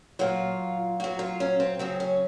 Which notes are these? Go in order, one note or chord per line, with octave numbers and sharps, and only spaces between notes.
A#2 F#3 F4
A#2 F#3 F#4
F4
C#4
C4
C#3 F#3 C4
C#4